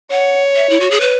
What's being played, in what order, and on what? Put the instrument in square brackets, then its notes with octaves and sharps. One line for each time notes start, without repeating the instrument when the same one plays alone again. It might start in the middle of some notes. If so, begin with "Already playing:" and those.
[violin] C#5 [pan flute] F#5
[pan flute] E5
E4
F#4
G#4
B4